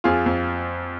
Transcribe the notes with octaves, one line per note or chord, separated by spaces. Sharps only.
F2 F4 G#4
F2